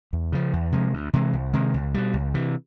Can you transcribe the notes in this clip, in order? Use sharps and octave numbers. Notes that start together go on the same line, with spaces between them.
E2
C#3 F3
E2
C3 F3 G#3
D2
C3 E3 G#3
C2
C3 D#3 G#3
C#2
B2 G3
C#2
C3 E3